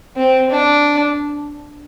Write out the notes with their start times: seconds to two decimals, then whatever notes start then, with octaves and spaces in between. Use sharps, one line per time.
0.16 C4
0.50 D4